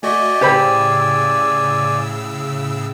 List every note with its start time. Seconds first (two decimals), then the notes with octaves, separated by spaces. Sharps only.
0.03 A3 F#4 D5 D#5 G#5
0.41 A2 C#3 G4 C5 B5 E6